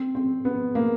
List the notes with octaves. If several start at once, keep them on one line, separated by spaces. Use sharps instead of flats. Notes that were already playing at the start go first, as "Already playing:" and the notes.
Already playing: C4
C4
B3
A#3